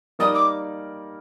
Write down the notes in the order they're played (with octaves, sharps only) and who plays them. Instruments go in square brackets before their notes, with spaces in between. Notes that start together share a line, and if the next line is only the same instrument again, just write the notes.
[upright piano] G3 A#3 D#4 A#4 D5 [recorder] D#6
[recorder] D6